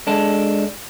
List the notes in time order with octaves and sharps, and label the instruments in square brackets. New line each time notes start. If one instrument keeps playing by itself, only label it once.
[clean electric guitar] G#3 D4 A4